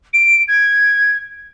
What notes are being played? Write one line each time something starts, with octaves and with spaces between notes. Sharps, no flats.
D7
G#6